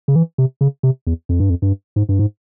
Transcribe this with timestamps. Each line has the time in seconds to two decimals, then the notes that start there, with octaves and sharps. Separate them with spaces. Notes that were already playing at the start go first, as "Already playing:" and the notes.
0.08 C#3
0.15 E3
0.38 C3
0.61 C#3
0.83 C3
1.07 E2
1.29 F2
1.40 G2
1.50 F2
1.62 G2
1.96 G#2
2.09 G2
2.19 G#2